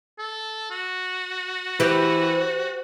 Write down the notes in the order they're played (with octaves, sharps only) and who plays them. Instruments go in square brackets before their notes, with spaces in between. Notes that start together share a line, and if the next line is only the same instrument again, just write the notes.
[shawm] A4
F#4
[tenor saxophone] E3 [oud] G4 B4 [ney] C5